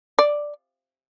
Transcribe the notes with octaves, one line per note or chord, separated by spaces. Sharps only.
D5